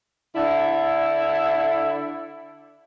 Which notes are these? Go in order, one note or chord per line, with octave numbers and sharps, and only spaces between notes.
D3 E4